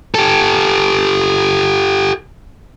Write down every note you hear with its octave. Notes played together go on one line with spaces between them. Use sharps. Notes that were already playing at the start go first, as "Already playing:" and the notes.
G4 A4